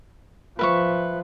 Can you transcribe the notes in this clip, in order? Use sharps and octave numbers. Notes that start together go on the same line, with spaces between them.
F3 B4 E5 C#6